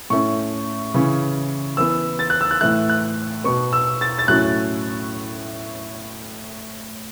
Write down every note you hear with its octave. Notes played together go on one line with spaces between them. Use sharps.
A2 A3 C#4 C#6
C#3 E3 C#4
E3 B3 E6
A6
F#6
E6
F#6
A2 E3 A3 F#6
F#6
B2 B3 C#6
E6
A6
A6
A2 F#3 A3 C#4 F#6